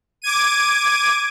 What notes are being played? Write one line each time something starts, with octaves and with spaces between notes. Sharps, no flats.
D6 G#6 D#7